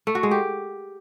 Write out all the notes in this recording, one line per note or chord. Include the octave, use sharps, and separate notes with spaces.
A3
F#4
G#3
G4